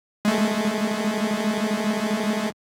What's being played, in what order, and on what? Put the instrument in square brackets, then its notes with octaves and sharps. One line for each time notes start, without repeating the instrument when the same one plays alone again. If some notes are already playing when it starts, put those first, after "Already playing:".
[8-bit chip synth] G#3 A3